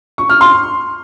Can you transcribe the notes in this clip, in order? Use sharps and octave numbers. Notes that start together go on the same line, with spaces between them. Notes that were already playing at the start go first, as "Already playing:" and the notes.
C#6
F6
C6